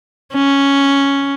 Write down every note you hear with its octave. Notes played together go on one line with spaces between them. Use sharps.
C#4